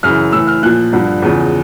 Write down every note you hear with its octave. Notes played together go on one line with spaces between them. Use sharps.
F#2 C#3 E3 F6
A2 E3 E6
F6
A#2 F3 F#6
G2 D3 F3
E2 C#3 F3